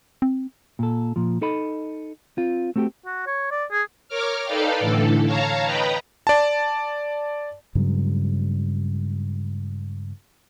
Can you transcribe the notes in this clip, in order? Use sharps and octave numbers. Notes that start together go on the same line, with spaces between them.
C4
A#2 A4
A#2 F3
D#4 A4 D#5 B5
C4 F4
A3 C4 F#4 G4
F#4
C#5
D5
G#4
A#4 C#5 D6 F6
D#4 A4 B4 D5 F5 G5
A2 D3 E3 A4
C#5 F5 A5 A#5
B4 D#5 G5 A#5 B5
D5 A5
G2 C#3 F#3 G#3